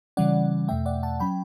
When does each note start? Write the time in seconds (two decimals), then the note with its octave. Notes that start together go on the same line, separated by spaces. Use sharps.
0.17 C#3 E3 G3 C#4 D5 F#5
0.68 E2 B2 A3 E5 G5
0.86 D5 F#5
1.03 F#5 A5
1.20 F#3 C#4 G5 B5